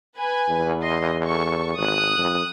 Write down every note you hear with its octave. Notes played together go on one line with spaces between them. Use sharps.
B4 G#5
E2
D#5 C6
A4 C#6
G#1 D#6 F#6
F2